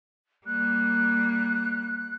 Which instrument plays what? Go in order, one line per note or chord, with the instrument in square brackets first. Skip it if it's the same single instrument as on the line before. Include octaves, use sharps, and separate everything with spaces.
[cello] G3 A#3 [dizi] F#6